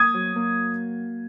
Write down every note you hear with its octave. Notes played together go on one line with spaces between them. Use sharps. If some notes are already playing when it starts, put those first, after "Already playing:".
Already playing: A#3 D#6 G#6
F#3
A#3